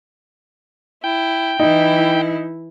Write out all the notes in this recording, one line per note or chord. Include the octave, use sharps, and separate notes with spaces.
E4 G5
E3 D#4 E4